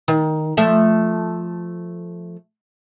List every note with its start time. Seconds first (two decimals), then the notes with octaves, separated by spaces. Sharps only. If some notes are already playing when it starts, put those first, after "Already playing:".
0.08 D#3
0.57 F3 A3 E5